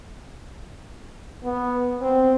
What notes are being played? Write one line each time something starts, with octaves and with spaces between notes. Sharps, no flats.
B3
C4